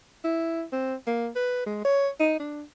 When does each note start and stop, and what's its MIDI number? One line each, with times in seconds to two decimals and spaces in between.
0.25 0.64 64
0.72 0.95 60
1.07 1.29 58
1.36 1.64 71
1.67 1.85 56
1.85 2.09 73
2.20 2.38 63
2.40 2.62 62